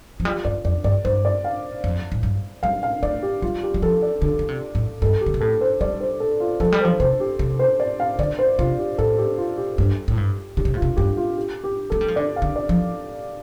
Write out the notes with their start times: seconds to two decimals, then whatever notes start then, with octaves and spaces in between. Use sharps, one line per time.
0.20 F3
0.25 G3 F4
0.45 G2 D5
0.65 F2 D5
0.84 G2 D5
1.04 G2 C5
1.25 D5
1.44 F5
1.84 F2
2.12 A2
2.23 G2
2.63 G3 F5
2.83 F5
3.03 A3 D5
3.23 G4
3.42 G3 F4
3.63 G4
3.74 G3
3.82 F3 A4
4.02 D5
4.22 D3 A4
4.39 D3
4.48 C3
4.75 A2
5.02 G2 A4
5.21 G4
5.26 D3
5.34 C3
5.41 A2 A4
5.61 C5
5.81 G3 D5
6.01 C5
6.20 A4
6.40 F4
6.60 F3 A4
6.72 G3
6.80 F3 C5
7.00 C3 C5
7.20 G4
7.39 C3
7.59 C5
7.80 D5
8.00 F5
8.19 D3 D5
8.39 C5
8.58 C3 F4
8.79 G4
8.98 A2 A4
9.18 G4
9.38 F4
9.58 G4
9.78 G2
10.08 A2
10.18 G2
10.57 D3 G4
10.65 C3
10.74 A2 F4
10.82 C3
10.97 G2 G4
11.17 F4
11.37 G4
11.64 G4
11.90 A3 A4
12.01 G3
12.08 F3
12.16 D3 D5
12.36 F5
12.42 D3
12.56 D5
12.69 F3